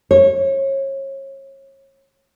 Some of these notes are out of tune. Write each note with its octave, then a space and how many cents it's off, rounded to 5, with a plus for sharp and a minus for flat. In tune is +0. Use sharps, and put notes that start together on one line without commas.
C#5 -30